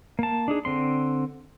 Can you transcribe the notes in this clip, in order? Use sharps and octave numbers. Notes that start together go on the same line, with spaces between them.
A#3 A5
D4 D#4 G#4
D3 C4 C6